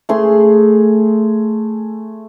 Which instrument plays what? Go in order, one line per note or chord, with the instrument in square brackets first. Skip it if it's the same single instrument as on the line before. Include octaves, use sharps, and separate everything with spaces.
[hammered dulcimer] A3 G#4 C6